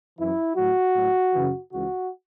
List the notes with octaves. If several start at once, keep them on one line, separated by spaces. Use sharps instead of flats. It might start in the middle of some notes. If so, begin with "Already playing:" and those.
F#2 E3 E4
A2 F#3 F#4
A2 F#3
F#2 C#3 E3
C#2 C#3 E3 F#4